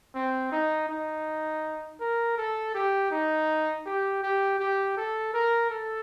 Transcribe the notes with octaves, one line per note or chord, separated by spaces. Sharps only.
C4
D#4
D#4
A#4
A4
G4
D#4
G4
G4
G4
A4
A#4
A4